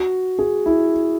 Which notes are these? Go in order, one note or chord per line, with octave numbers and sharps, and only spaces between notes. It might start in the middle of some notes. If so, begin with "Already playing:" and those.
Already playing: F#4
G#4
E4